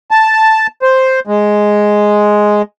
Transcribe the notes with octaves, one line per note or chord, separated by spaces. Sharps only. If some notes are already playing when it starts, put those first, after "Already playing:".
A5
C5
G#3